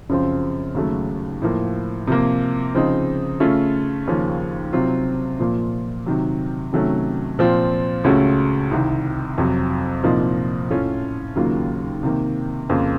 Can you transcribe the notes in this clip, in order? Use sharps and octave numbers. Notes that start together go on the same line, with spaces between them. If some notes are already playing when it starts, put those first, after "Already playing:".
F#2 C#3 F3 C4
D#2 C#3 F#3 A3
A2 F3 A#3
C3 F3 A#3
C#3 F3 C4 D#4
C#3 A3 C#4 F4
D#2 C#3 F3 A#3 C#4
C3 F#3 C4 F4
A#2 F3 A#3
C3 D#3 F#3
C3 D#3 F#3 A3 C#4
A#2 F3 C4 F4
C#2 C#3 A3 C#4 F#4
C2 C3 D#3
F2 C3 F#3
C2 A#2 F3 A#3 D#4
A2 A3 C#4 F4
D#2 C#3 F#3 A#3 F4
C3 D#3 A#3
F2 C#3 F3 A#3